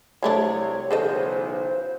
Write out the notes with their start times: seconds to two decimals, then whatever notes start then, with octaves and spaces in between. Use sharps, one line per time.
0.23 C2 C3 F#3 A3 D4 C#5
0.91 B1 C#3 E3 G#4 A4 C5 D#5